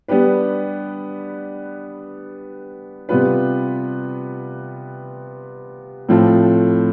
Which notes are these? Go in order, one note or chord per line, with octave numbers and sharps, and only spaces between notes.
G3 B3 D4 G4 B4
C3 G3 B3 F4 B4
A2 F3 A3 C4 F4